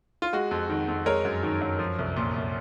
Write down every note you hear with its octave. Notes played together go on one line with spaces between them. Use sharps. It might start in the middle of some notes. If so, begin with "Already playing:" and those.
F4
G#3 F#4
F2
D#3
F2
G#3 A#4 C#5
F#2
D#3
F#2
F3
C2
A#2
C2